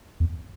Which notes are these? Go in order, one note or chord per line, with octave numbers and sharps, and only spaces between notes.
E2